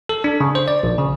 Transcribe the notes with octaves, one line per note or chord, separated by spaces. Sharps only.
A4
D4
C#3
C5
D5
A#1
C#3